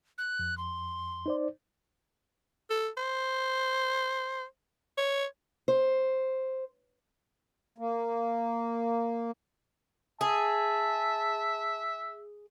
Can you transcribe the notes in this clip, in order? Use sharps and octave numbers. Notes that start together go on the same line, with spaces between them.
F#6
F2
C6
D#4 C5 D5
A4
C5
C#5
C5
A#3
G#4 E5 A5